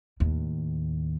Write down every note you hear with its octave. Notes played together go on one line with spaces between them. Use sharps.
D#2 A2